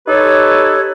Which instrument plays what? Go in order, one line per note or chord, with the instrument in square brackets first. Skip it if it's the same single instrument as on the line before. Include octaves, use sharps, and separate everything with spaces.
[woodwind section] D#4 G4 A4 B4 C#5